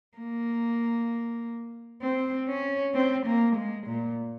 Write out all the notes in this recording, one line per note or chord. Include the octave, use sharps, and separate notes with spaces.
A#3
C4
C#4
C4
A#3
G#3
A#2